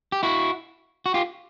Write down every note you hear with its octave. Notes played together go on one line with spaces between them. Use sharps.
G4
E4 F#4
F#4
F4 G4